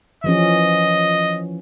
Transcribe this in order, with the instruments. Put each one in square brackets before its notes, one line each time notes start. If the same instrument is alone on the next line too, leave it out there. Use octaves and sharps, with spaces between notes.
[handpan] E3 F3 C#4 [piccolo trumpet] D#5